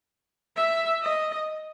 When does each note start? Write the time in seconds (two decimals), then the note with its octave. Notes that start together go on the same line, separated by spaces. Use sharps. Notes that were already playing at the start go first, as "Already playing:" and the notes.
0.56 E5
1.02 D#5